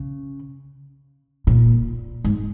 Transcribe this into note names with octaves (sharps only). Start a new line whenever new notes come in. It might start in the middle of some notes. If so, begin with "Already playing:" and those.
Already playing: C#3
A#2
G#2